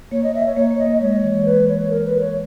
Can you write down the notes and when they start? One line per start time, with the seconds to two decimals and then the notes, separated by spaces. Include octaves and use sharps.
0.11 A#3 C#5
0.23 D#5
0.35 E5
0.46 C#5
0.57 A#3 C#5
0.71 A#3
0.79 D#5
0.86 A#3
1.01 G#3 C#5
1.24 E3
1.45 E3 B4
1.68 C#5
1.90 A#4
2.05 B4
2.20 C#5